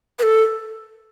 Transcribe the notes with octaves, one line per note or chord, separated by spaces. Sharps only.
B4
A4